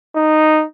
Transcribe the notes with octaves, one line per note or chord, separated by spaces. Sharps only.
D#4